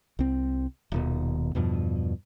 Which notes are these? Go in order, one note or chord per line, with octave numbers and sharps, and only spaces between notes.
C2 C4
D#1 D#2 B2
E2 G2 B2 F3